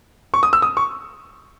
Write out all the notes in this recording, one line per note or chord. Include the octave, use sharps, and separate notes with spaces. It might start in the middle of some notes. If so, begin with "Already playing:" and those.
C#6
D#6
E6
D#6
C#6